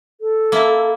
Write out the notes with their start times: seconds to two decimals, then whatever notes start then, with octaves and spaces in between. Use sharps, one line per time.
0.21 A4
0.52 A#3 E4